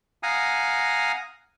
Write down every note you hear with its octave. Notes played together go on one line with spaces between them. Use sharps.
F5 F#5 G#5 A#5 D#6